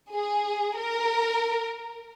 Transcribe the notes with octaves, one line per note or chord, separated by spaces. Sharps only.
G#4
A#4